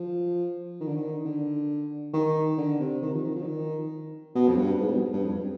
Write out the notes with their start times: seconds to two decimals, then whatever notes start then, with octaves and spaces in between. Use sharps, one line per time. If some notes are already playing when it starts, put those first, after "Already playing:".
Already playing: F3
0.81 D#3
0.88 D3
0.96 D#3
1.25 D3
2.14 D#3
2.58 D3
2.80 C3
3.02 D#3
3.14 F3
3.24 D#3
3.35 F3
3.42 D3
3.46 D#3
4.35 B2
4.48 F2
4.57 G2
4.80 G#2
4.90 B2
5.13 G2
5.24 F2